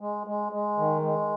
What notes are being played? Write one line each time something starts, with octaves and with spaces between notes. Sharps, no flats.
G#3
G#3
G#3
D#3
G#3